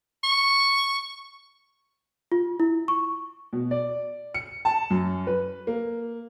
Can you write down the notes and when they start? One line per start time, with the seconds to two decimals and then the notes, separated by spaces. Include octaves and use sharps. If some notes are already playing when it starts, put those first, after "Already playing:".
0.24 C#6
2.32 F4
2.60 E4
2.88 C#6
3.53 B2
3.71 D5
4.34 C#7
4.65 A5
4.90 F#2
5.27 B4
5.67 A#3